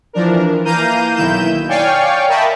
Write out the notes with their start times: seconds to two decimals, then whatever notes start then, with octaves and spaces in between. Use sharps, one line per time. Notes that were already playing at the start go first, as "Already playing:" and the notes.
0.13 E3 F3 D4 A#4
0.65 E3 A#3 F5 A#5 G6 D#7
1.15 B1 D#3 E4 G6 E7
1.69 C#5 D5 F5 G5 G#5 C#6
2.28 A#4 D#5 E5 G5 A5 B5